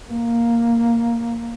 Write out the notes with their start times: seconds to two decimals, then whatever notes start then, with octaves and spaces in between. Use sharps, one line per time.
0.10 A#3